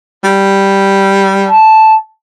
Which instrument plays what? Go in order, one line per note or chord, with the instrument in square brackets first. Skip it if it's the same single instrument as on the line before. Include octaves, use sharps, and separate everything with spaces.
[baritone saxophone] G3
[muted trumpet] A5